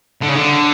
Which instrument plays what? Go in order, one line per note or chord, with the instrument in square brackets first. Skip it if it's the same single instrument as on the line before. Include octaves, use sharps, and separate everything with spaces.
[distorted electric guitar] D3
C#3
D3